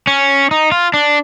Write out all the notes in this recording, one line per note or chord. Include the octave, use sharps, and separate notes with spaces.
C#4
D#4
F4
D4